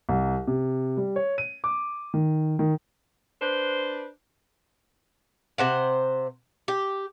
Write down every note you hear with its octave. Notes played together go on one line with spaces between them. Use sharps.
C2
C3
G3
C#5
D#7
D6
D#3
D#3
D4 B4 C5
C3 C5 F#5
G4